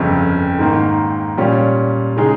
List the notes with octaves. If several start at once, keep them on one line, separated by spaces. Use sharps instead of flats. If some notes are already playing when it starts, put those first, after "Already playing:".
Already playing: G1 F2 C#3
G#2 D#3 A#3
A#2 G3 C#4 F4
C#3 G#3 D#4 G#4